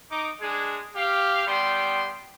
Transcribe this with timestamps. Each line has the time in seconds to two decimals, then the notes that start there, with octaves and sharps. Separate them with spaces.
0.10 D#4 D6
0.41 G#3 D4 G#4
0.95 G4 F5
1.47 G3 B3 G5 C6